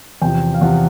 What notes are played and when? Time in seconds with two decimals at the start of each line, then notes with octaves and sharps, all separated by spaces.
0.22 E2 C3 F3 G5
0.54 F5
0.61 E2 C3 F3 F#5